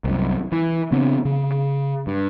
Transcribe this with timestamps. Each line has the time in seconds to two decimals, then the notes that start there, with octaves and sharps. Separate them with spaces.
0.04 C2 F#2
0.52 E3
0.92 C#3 B3 C4 D4
1.25 C#3
2.07 G2